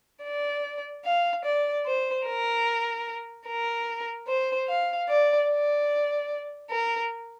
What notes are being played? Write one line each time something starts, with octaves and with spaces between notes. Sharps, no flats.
D5
F5
D5
C5
A#4
A#4
C5
F5
D5
D5
A#4